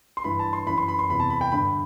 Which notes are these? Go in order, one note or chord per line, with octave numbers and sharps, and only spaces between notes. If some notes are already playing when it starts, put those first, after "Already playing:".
C6
G2 E3 B5
A5
C6
F#2 E3 B5
C6
B5
C6
E2 C3 E3 B5
A5
B5
G5
G2 D3 B5